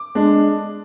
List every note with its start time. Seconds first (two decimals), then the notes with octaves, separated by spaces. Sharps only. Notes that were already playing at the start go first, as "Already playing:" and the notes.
Already playing: D6
0.15 G#3 D4